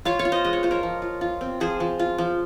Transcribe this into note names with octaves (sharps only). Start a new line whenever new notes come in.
F4 C#5 F5
C#5 F5
F4
C5 D#5
G#3 D#5
C#5
F4 C5
A#4 C#5
F3
F4
F4
C4
F3 G#4 C5
F3
F4
F3